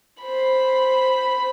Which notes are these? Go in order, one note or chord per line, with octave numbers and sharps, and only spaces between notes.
C5 B5